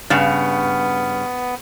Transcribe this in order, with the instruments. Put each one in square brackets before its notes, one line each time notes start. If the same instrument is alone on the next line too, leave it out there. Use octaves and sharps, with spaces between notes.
[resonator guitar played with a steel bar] G2 C#3 [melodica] B3